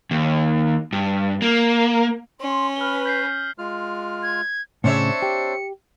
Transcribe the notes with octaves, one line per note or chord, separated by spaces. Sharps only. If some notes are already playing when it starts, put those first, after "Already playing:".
D#2
G2
A#3
C#4 C6
B4 F6 F#7 G7
G6 B6 C7
G#3 F4 F6
G#6
A2 C#3 C4 D4 C#5 D5 E5 C#7
G4